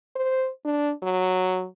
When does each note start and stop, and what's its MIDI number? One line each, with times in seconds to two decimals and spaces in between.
0.16 0.50 72
0.65 0.91 62
1.03 1.66 54